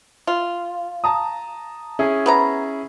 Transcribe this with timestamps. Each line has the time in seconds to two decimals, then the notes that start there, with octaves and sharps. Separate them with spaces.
0.27 F4
1.04 A5 A#5 D#6
1.99 C#4 E4 G#4
2.26 B3 B4 A#5